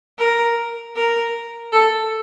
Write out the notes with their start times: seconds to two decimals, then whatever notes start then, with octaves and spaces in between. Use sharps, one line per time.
0.19 A#4
0.96 A#4
1.73 A4